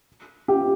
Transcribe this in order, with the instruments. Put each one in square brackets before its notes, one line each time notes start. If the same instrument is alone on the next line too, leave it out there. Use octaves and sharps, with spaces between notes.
[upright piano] G4